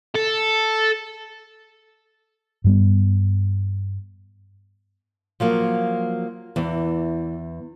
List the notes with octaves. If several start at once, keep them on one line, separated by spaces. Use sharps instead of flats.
A4
G2 G3 B3
F3 F#3 A#3
E2 E3